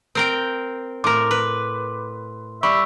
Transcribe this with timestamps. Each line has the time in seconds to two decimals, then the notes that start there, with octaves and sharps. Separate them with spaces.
0.15 C4 A#4 G5
1.04 A2 A#4 C6 D6
1.31 B4
2.63 G3 E5 B5 C#6 E6